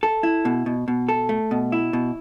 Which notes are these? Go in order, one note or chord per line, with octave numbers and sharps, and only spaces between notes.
A4
E4
B2
B2
B2
A4
A3
B2
E4
B2